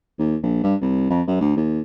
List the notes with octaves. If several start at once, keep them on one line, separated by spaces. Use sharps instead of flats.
D#2
A#1
G2
C2
F2
F#2
D2
D#2